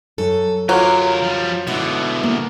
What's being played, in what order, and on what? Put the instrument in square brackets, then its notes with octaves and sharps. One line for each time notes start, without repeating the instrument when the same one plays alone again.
[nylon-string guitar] F#2 [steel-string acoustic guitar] A4
[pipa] F#3 [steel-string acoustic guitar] F4 [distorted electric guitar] G4 A#4
[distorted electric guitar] F3 G3
[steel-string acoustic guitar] G#2 B3 E4 [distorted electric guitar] B2 D3
[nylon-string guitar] A#3